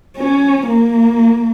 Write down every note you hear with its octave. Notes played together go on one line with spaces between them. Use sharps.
C#4
A#3